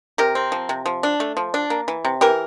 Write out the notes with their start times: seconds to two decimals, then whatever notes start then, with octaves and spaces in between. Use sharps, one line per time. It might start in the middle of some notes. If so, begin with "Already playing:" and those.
0.18 C3 G4 A#4
0.35 C4
0.52 F3
0.69 C3
0.86 F3
1.03 D4
1.20 A3
1.37 F3
1.54 D4
1.70 A#3
1.88 E3
2.05 C3
2.21 E3 G4 A#4